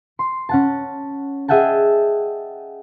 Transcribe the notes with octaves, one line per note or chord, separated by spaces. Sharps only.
C6
C#4 F#5 A5
G#4 D#5 E5 F#5 G5 A5